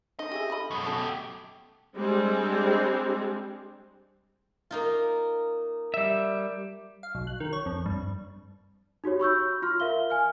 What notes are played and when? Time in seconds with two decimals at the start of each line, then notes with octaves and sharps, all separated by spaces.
0.19 D#4 D#5
0.32 G4 G#4 E5
0.50 D3 F4 B5
0.71 F#2 B2
0.84 C#4 F#4 A4
0.98 A3 G4
1.96 G3 G#3 C4 D4
4.71 A#3 D#4 F4
5.94 G3 E5
7.03 F5
7.15 B1
7.27 F#6
7.40 D#3
7.53 C#5
7.66 F2
7.86 G2
9.04 D#4 F#4 G4 C#5
9.20 B5 C#6 E6 G6
9.62 F4 C6 F6
9.80 A#4 E5 F5 G7
10.10 G#5 F6